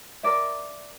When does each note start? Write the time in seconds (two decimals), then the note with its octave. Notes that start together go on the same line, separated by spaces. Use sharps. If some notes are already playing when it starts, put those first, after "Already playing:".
0.23 A#4 D5 E5